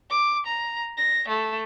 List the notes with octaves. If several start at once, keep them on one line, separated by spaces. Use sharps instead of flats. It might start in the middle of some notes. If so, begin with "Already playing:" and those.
D6
A#5
A#6
A3